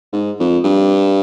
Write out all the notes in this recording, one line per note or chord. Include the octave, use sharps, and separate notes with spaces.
G#2
F2
G2